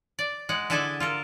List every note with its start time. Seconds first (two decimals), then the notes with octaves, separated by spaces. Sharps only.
0.19 D5
0.49 G#3 F#5
0.70 D3 E4 G#4 A4 E5 G#5
1.00 F4 A4 A#4